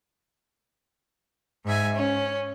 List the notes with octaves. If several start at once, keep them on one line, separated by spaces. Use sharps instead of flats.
G#2 E5 G#5
C#4